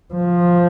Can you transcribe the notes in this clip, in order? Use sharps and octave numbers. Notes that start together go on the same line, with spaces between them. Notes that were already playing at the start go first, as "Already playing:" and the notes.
F3